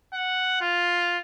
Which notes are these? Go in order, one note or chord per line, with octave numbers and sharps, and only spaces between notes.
F#5
F4